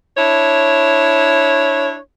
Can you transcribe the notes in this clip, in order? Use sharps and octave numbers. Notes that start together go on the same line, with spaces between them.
D4 E4 C#5